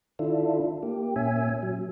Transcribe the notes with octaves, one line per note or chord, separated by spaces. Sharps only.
D#3 D4 E4 F4 A4
A#3 G4
A#2 C#4 E5 G#5
F#3